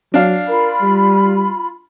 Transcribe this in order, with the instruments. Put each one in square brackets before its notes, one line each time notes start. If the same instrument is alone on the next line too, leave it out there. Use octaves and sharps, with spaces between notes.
[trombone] F#3 [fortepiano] D4 F5
[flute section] F4 B5 [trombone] A#4
[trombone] G3